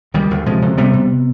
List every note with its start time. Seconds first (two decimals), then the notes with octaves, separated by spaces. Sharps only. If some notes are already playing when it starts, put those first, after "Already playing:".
0.14 D2 D#3 G3
0.31 D2
0.46 C3 F3 G#3
0.62 C3
0.77 C3 G3 B3
0.93 C3